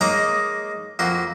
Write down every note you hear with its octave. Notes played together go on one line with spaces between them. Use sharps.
G#3 A#3 D#4 C#5 A#5 D6
F2 A#3 F#4 C6